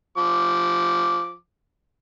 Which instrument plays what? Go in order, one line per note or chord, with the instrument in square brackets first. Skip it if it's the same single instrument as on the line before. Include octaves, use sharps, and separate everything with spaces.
[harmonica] F3 D6